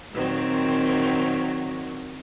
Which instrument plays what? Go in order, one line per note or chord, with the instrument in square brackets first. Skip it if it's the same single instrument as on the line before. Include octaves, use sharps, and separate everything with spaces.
[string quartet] A#2 D#3 F#3 C4